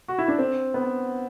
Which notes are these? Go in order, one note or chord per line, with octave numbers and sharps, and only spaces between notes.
F#4
E4
D4
C4
B3